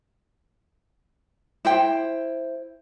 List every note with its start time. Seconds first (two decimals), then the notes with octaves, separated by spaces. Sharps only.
1.65 E4 C5 G5